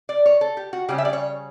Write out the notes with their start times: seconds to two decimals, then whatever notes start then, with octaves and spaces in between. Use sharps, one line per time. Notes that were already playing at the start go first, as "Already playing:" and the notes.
0.09 D5
0.26 C#5
0.41 A4
0.57 G4
0.73 F#4
0.89 C#3 G3 C#4 G4
0.98 E5
1.05 D5
1.13 C#5